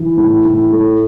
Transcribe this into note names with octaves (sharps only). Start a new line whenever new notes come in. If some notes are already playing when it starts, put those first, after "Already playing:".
Already playing: E3
A2
A2
A3